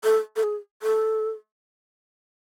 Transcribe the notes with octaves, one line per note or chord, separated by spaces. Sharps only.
A4
A4
G#4
A4